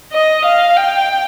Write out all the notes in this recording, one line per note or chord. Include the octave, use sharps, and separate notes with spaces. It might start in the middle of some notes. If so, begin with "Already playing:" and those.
D#5
F5
G5